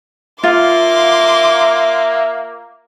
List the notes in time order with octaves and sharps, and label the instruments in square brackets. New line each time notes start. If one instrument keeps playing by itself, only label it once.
[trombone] A#3 [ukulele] F4 [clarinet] E5 [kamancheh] C6 D6